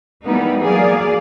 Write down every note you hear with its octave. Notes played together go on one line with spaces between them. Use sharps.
E3 G3 G#3 A#3 B3 D#4
F#3 A#3 G#4 D5 F5